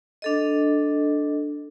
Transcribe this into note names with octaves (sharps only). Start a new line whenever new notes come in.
D4 A4 D#5